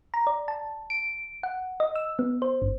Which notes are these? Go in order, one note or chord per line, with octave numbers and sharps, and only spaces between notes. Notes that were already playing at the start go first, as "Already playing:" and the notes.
A#5
D5
A5
D7
F#5
D#5
E6
B3
C5
G1